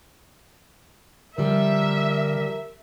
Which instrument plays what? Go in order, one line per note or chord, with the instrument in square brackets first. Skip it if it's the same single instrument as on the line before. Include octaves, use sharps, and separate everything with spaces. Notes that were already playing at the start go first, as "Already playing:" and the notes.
[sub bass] D3 [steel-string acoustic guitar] F3 G3 [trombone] A#4 [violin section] E5